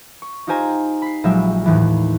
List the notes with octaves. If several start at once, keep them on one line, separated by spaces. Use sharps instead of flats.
C#6
D#4 F4 G4 C5 G#5 A#5
B5 C7
A#1 F3 F#3 G#3 G4 E5
D#2 A2 E3